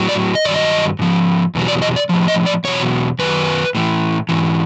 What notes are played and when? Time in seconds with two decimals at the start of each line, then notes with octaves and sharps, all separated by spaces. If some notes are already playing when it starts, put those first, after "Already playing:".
Already playing: A2 F#3
0.09 D5
0.35 D#5
0.45 G2 D#3 F#3 D5
0.54 D#5
0.99 G#2 F3
1.55 E2 B2 F#3
1.68 D5
1.82 D#5
1.96 D5
2.09 A2 F3
2.28 D#5
2.46 D5
2.64 E2 B2 F#3 C#5
3.19 F#2 D#3 F#3 B4
3.75 A2 E3
4.29 G#2 E3